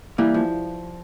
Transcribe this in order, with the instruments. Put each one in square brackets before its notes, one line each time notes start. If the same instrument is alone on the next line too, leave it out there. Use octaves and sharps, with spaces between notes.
[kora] E3 G3 [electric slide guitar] A#3
[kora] F3